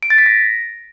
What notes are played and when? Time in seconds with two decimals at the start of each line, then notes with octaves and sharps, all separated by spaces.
0.03 D7
0.10 A6
0.18 B6
0.26 A#6